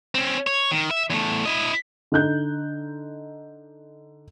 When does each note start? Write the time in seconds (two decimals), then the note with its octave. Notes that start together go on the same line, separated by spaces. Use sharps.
0.15 C4 C#4
0.47 C#5
0.71 D#3
0.91 E5
1.10 E2 A3
1.46 E4 D#5
2.12 D3 D#4 F#6 G6